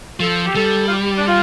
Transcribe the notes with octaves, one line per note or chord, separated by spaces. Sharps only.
F3 A4
G4
G3 A4
F4
G4
D4
F4